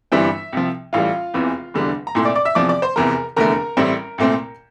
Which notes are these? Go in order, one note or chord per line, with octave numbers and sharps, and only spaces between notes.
G1 G2 E3 G3 C4 E5
C2 C3 F3
A1 A2 E3 G3 F4 F5
F1 E2 C3 E3
F1 E2 D3 G3
A#5
C2 A#2 A3 E4 C6
D5 D6
D5 D6
E5 E6
E2 C3 F3 D5 D6
D5 D6
C5 C6
F1 E2 C3 E3 A#4 A#5
F1 E2 D3 A3 A#4 A#5
A1 A2 G3 C4 E4
C2 A#2 A3 C4